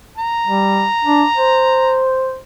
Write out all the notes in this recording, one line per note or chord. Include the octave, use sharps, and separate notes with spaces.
A#5
G3
D4
C5